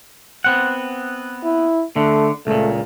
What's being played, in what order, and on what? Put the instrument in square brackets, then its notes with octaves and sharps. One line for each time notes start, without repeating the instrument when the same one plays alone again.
[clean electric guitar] B3 C4 F#5
[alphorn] E4
[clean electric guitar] D3 [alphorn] A3
[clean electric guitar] C#2 A#2 [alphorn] A3